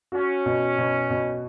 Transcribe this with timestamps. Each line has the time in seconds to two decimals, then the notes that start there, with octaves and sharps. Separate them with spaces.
0.12 C#4 F#4
0.46 B2
0.78 B2
1.10 B2